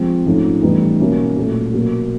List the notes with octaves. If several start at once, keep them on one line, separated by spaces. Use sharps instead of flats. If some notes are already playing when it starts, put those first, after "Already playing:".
Already playing: F3 G#3 C4
G#2 F3 A3 C#4
A2 E3 G3 B3 D#4
B2 F#3 A#3 C#4 E4
A#2 F#3 A3
B2 F#3 A#3